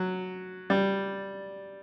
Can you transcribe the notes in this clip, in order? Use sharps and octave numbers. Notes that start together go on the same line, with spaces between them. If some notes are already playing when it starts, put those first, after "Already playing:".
Already playing: F#3
G3